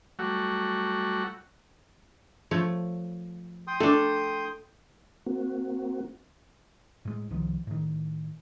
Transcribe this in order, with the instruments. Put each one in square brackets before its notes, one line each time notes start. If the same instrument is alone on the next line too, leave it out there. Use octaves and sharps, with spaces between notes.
[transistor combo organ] F#3 G3 A3 F#4
[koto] F3 A3 C#5
[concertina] G5 C6 D#6
[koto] A3 D4 [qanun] A4
[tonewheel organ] A#3 C4 F#4
[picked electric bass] A2 G#3
C2 D#3 F3
A2 D#3